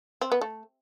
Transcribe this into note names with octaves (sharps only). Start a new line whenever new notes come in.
C4
B3
A3